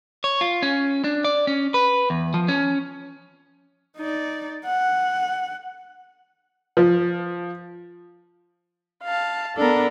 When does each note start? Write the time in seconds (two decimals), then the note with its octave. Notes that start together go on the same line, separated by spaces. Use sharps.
0.24 C#5
0.41 F4
0.62 C#4
1.04 D4
1.25 D5
1.47 C#4
1.74 B4
2.10 E2
2.34 F3
2.48 C#4
3.97 D#4 D5
4.66 F#5
6.77 F3
9.03 F5 A5
9.57 B3 D4 A4 A#4